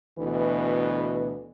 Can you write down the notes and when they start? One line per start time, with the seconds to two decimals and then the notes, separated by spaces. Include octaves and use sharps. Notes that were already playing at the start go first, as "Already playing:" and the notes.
0.19 D2 B2 E3 B4